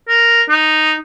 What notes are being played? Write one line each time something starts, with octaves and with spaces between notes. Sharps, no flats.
A#4
D#4